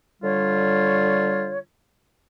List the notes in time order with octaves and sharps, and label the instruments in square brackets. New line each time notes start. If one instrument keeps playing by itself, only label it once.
[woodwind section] D3 G3 F4 C#5